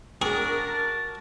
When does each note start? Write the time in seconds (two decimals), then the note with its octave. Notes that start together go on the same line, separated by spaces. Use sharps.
0.22 D4 F#4 G#4 A#4
0.59 A5